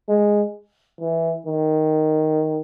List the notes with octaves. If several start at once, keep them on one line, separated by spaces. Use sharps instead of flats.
G#3
E3
D#3